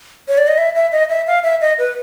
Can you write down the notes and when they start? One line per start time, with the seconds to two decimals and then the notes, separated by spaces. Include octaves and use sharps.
0.28 C#5
0.38 D5
0.47 D#5
0.58 E5
0.75 E5
0.92 D#5
1.09 E5
1.27 F5
1.43 E5
1.61 D#5
1.78 B4